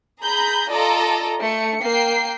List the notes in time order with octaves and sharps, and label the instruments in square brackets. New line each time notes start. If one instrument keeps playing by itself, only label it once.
[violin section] G#4 A#5 B5 G6
F4 A4 D5 D#5 A#5
A3 C#7
A#3 G5 C7